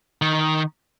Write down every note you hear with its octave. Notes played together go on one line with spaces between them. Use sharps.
D#3